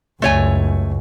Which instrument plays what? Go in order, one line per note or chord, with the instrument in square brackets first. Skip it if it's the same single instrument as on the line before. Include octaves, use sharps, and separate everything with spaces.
[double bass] C#2 F#2 [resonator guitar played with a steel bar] A3 C#5 G#5